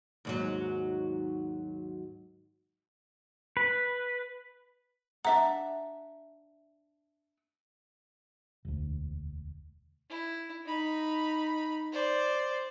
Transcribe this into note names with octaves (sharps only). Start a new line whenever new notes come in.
D#2 G#2 F#3
B4
D4 E5 F#5 A#5
E1 D2
E4
D#4 B5
C5 D5